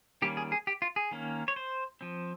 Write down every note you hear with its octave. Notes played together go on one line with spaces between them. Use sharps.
D#3 G3 A#3 C#4 G4
G#4
G#4
G4
F4
G#4
D#3 A#3 C#4
C#5
C5
F3 C4